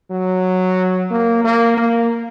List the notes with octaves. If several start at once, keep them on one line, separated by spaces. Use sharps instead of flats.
F#3
A#3
A#3
A#3